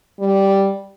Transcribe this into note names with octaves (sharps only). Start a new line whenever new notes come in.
G3